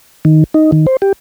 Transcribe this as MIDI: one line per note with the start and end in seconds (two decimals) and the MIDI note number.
0.25 0.44 51
0.54 0.71 63
0.72 0.86 51
0.87 0.97 72
1.02 1.13 67